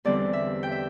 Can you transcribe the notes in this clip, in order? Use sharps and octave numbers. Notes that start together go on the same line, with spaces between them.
E2 D3 G3 C4 D5
E5
G5
E5